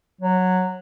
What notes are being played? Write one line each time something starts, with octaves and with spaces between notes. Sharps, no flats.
F#3